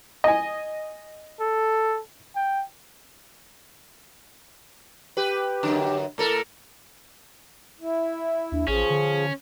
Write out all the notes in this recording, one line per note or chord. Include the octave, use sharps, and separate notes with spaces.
D#5 G#5
A4
G5
G4 B4
F#2 D3
A2 A4 A#4
E4
D#2 D4
A1 F3 C#4 G#4
D3